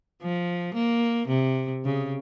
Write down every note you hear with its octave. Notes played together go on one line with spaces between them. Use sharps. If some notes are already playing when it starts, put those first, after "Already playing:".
F3
A#3
C3
C#3